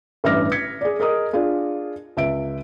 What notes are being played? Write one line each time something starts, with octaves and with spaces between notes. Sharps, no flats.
A1 G2 E5 D6 F6 A#6
G#6 B6 C#7
G#4 D5
G#4 A#4 D#5 D#6
D4 F4 G#4
C#2 E5 D7